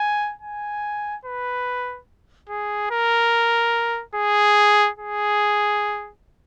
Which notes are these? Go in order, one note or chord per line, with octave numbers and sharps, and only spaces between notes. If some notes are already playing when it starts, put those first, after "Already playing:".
Already playing: G#5
G#5
B4
G#4
A#4
G#4
G#4